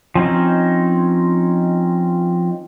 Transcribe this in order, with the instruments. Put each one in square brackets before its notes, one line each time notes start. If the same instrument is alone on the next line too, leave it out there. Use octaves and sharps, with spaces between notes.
[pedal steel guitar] F3 C4 C#4 D#4